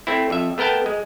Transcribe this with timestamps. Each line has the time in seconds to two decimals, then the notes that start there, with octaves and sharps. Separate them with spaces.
0.07 A3 C4 E4
0.30 F2 E5
0.58 A3 B3 A#4 G5 A5
0.86 G#3